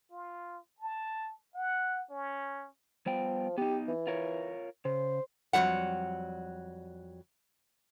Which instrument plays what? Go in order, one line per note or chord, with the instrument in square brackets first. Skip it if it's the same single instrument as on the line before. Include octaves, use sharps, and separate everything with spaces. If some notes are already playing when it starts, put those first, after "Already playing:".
[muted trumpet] F4
A5
F#5
C#4
[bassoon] F3 [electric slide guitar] G3 B3 G5
[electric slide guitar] B3 D#4 [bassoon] G4
[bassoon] E3
[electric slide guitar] F4 A#4 C#5
[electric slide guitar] C#3 [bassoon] C5
[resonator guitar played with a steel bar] F2 G#2 F#3 G3 F#5